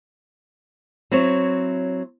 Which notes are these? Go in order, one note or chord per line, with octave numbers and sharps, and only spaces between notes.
F#3 C4 E4 C#5